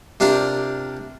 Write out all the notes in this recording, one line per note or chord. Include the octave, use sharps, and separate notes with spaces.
C3 D4 F4 G4 A#4